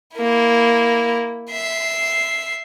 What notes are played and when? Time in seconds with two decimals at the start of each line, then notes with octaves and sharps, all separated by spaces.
0.16 A#3 E4
1.51 E5 C7